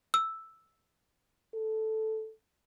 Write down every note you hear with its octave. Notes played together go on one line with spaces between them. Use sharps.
E6
A4